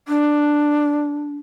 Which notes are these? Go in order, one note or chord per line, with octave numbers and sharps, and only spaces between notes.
D4